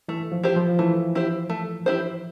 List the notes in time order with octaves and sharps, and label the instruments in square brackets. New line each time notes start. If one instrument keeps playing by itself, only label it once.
[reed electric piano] E3 [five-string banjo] A3
[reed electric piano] F3
[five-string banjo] E4 G4 C5
[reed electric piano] F3
[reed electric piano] E3 [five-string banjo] A3
[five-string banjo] E4 G4 C5
A3
E4 G4 C5